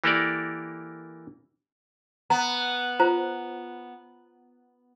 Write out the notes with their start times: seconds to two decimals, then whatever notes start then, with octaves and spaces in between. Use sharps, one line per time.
0.04 E3 A#3 G4 A4 A#4 D5
2.30 B3 A#5
3.00 F4 C5 A#5